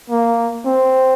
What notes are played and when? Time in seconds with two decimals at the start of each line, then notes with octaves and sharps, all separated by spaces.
0.10 A#3
0.66 C4